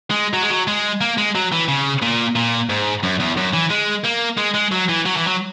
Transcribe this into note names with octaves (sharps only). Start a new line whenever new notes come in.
G#3
F#3
G#3
F#3
G#3
A#3
G#3
F#3
E3
C#3
A#2
A#2
G#2
F#2
E2
F#2
E3
G#3
A#3
G#3
G#3
F#3
E3
F#3
E3
F#3